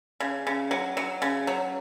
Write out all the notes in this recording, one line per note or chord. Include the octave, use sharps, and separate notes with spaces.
C#3
C#3
F#3
F#3
C#3
F#3